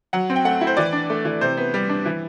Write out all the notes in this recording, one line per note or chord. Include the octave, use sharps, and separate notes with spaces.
F#3 F#5
C4
G5
A3 F#5
E4
C5
E3 D5
D4
A3
E3
C3 C5
B3
G3
D4
E3